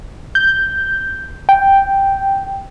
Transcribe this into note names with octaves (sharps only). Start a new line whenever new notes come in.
G6
G5